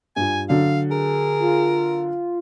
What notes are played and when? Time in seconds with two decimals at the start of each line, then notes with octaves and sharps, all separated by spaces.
0.16 G2 F4 G#5
0.49 D3 F#3 D4 F5
0.91 G#4 A#4
1.40 F4